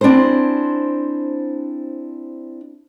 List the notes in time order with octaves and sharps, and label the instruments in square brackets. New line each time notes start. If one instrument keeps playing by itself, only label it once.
[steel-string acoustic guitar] C4 D4 E4 G#4 C5